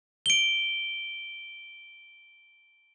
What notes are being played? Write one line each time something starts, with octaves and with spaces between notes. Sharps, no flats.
D7 G7